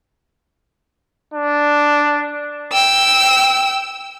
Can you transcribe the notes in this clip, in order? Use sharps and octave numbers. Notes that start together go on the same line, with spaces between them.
D4
G5 E6